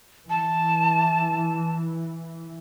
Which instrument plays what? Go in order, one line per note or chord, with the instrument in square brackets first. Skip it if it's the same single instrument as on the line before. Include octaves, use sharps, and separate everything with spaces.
[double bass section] E3 [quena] A5